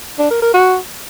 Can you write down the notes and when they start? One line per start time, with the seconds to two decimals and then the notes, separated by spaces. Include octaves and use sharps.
0.19 D4
0.31 A#4
0.42 A#4
0.54 F#4